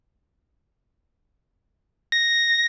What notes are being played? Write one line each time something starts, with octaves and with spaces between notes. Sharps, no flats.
A#6